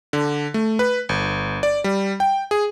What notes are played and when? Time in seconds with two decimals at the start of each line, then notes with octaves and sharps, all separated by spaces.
0.13 D3
0.54 A3
0.79 B4
1.09 G1
1.63 D5
1.84 G3
2.20 G5
2.51 G#4